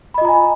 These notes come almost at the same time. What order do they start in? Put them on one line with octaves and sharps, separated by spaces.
B5 D#5 F4 A#5 G#5